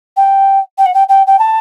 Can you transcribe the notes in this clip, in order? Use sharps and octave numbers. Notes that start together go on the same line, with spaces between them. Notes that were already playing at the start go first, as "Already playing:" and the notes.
G5
G5
F#5
G5
G5
G5
A5